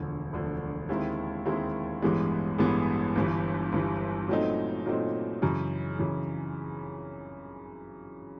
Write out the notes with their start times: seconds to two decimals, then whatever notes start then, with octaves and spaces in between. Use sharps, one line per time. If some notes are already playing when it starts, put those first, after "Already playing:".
Already playing: E1 D2 D3 F3
0.33 E1 D2 D3 F3
0.89 D#2 D#3 G#3 C4 E4
1.45 D#2 D#3 G#3 C4 E4
2.02 A1 G2 E3 G#3 B3
2.59 A1 G2 E3 G#3 B3
3.15 G1 G2 E3
3.72 G1 G2 E3
4.28 A#2 F#3 A3 C4 D#4
4.86 A#2 F#3 A3 C4 D#4
5.42 F#2 C#3 E3
5.99 F#2 C#3 E3